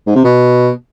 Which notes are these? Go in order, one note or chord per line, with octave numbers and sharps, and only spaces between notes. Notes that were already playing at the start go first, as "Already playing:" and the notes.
G#2
C3
B2